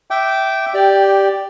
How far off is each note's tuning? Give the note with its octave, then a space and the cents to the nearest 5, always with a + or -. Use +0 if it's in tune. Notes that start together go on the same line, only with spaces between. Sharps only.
E5 +0 G5 -15 D6 +0
G4 +0 D5 +0 G5 +10